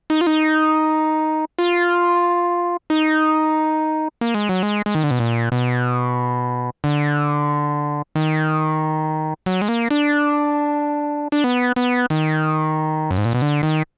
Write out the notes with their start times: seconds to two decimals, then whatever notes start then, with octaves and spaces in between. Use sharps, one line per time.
0.10 D#4
0.21 F4
0.27 D#4
1.59 F4
2.90 D#4
4.21 A#3
4.35 G#3
4.49 F#3
4.63 G#3
4.86 G#3
4.95 D#3
5.04 D3
5.11 B2
5.20 A#2
5.52 B2
6.84 D3
8.15 D#3
9.46 F#3
9.62 G#3
9.69 A#3
9.91 D4
11.32 D4
11.44 B3
11.76 B3
12.10 D#3
13.11 F#2
13.18 G#2
13.25 A#2
13.34 B2
13.42 D3
13.63 D#3